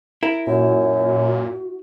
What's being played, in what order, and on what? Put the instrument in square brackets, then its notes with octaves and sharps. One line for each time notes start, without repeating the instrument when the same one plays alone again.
[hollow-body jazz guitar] E4 A#4
[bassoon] F#2 [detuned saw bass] A#2 [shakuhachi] F#4